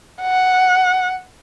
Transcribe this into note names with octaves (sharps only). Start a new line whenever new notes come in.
F#5